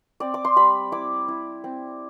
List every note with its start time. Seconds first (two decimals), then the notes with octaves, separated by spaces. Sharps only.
0.20 C4 D5
0.34 D6
0.45 C6
0.56 G3 B5
0.92 E4 D6
1.28 E4
1.64 C4